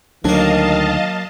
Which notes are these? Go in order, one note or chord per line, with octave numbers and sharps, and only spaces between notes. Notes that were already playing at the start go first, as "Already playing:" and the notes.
D2 D#3 F#3 A#3 D4 D#5 F5 A5